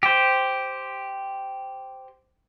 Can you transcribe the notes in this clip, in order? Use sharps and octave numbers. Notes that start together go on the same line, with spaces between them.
G4 C5